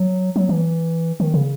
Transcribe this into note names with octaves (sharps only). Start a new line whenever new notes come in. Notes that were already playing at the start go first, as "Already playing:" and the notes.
Already playing: F#3
F#3
E3
D#3
C#3